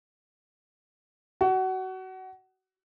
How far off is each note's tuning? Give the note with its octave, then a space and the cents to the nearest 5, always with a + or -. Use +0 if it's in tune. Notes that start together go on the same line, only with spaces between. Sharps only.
F#4 +25